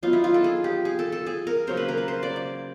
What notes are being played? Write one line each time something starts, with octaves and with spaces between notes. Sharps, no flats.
F#3 B3 D#4 F4
E4
F4
A4
G#4
G4
G#4
A4
A4
G#4
A#4
C#3 F#3 A#3 C5
B4
A#4
B4
C5
D5
D5